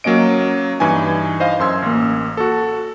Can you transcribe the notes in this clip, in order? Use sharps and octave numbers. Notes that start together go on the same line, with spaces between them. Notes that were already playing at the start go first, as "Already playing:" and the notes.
F#3 A#3 C#4 D#5 D7
G2 E3 D#4 G#5
C5 D#5 F5
F#2 C6 E6 G#6
A1 A#3
F#4 A4